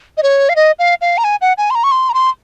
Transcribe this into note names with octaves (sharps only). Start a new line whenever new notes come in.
D#5
C#5
F5
D#5
F5
F5
A#5
G#5
F#5
G#5
C6
A#5
C#6
C6
A#5
C6